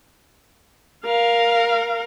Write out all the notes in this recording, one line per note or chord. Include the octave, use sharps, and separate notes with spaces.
A#4 F5